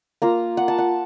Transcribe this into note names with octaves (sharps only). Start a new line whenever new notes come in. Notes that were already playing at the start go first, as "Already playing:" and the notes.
A#3 F4 A#5
F#5
A5
F#5